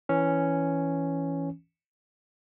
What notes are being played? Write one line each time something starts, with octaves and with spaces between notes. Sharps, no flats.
E3 C#4